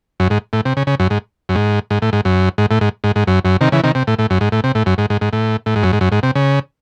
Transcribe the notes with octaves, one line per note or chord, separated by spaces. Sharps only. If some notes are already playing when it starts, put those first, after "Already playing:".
F#2
G#2
A2
C3
C#3
C#3
F#2
G#2
F#2
G#2
G#2
A2
G#2
F#2
G#2
A2
G#2
G#2
G#2
F#2
F#2
C3 D#3
C#3 E3
C3 D#3
C3
A2
A2
F#2
G#2
A2
C3
A2
F#2
G#2
G#2
G#2
A2
A2
G#2
F#2
G#2
F#2
G#2
C3
C#3